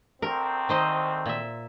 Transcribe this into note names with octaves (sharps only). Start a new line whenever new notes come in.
D2 C4 A#4
D#3 C5 D#5
A#2 E5